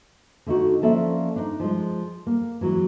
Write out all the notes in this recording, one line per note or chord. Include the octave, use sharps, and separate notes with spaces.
D3 A3 D#4 F#4
F3 A#3 C#4 A4 D5 E5
D4 D#4
F3 G#3
A#3
E3 F#3 G#3